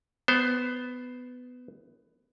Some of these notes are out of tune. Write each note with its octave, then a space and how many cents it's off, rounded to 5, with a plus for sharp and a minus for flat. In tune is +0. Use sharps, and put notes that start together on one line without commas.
B3 +15 C5 +0